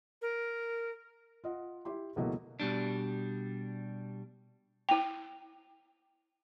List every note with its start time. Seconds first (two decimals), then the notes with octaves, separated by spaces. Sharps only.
0.22 A#4
1.44 F4 D#5 F#5
1.85 E4 G4 C6
2.16 C#2 B2 E3 F#3 A3 A#3
2.60 B2 G3 D4
4.89 E4 G5